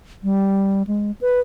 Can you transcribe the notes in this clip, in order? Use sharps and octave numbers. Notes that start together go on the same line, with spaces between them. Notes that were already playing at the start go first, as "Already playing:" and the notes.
G3
G#3
B4